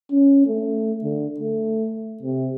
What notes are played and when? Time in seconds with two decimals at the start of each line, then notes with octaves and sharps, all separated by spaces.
0.11 C#4
0.46 A3
1.03 D3
1.40 A3
2.23 C3